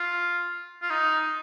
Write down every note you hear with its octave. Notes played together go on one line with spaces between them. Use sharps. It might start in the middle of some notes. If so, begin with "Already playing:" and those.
Already playing: F4
F4
D#4